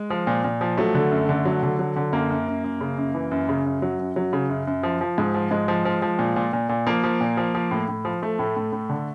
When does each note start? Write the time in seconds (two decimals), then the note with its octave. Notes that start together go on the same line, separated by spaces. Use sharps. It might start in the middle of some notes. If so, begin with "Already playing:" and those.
Already playing: G#3
0.10 F3
0.27 A#2
0.44 A#2
0.61 F3
0.77 F#3 A3
0.95 D3
1.11 F#2
1.29 D3
1.45 F#3
1.63 D3
1.79 F#3
1.96 D3
2.13 F#2 A#3
2.30 F#2
2.47 F#2
2.64 F#2
2.81 C#3
2.98 F#2
3.15 E3
3.31 F#2
3.49 C#3
3.66 F#2
3.82 F#3
3.99 F#2
4.16 F#3
4.33 C#3
4.49 F#2
4.67 F#2
4.83 F3
5.01 F3
5.18 G#2
5.34 F3
5.51 G#2 G#3
5.68 F3
5.85 F3
6.02 F3
6.19 A#2
6.36 A#2
6.53 A#2
6.69 A#2
6.87 F3 A#3
7.03 F3
7.21 A#2
7.37 F3
7.55 F3
7.71 A2
7.88 A2
8.05 F3
8.22 F3 A3
8.39 A2
8.56 A2
8.72 A2
8.89 D3